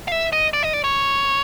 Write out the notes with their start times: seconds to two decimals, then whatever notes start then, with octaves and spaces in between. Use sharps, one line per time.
0.08 F5
0.12 E5
0.33 D#5
0.53 D5
0.63 D#5
0.73 D5
0.84 C#5